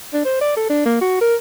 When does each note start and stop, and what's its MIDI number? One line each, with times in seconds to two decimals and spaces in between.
0.14 0.22 62
0.25 0.39 72
0.41 0.56 74
0.57 0.65 69
0.69 0.82 62
0.85 0.97 58
1.01 1.21 66
1.21 1.35 70